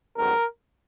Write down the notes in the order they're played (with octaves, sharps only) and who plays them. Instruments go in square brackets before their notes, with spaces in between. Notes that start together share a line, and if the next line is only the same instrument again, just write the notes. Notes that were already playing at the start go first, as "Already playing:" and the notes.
[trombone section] A1 G#2 D#3 F#3 B3 A#4